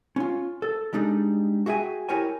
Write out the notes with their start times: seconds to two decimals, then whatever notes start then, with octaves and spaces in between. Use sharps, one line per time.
0.16 C#4 F4
0.62 A4
0.93 G3 G#3 D4 D#4
1.66 F#4 G#4 E5 G5 G#5
2.09 E4 G4 A#4 C#5 G#5